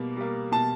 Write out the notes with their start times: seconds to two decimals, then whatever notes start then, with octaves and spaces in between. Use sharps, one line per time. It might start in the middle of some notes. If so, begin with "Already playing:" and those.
Already playing: B2 G3 A#3
0.17 G3 A#3
0.52 B2 A5